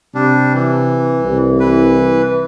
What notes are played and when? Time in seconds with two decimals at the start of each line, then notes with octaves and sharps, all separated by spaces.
0.15 C3 G3 D4
0.53 E3
1.23 C2
1.60 E3 B4